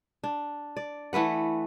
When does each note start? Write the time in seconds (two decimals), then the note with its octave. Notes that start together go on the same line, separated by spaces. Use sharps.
0.24 D4
0.77 D5
1.13 E3 A3 B4 F#5